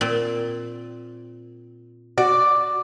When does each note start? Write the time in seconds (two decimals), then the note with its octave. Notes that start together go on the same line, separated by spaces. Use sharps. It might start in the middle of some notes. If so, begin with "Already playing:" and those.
0.01 A#2 C4
2.18 F#4 D5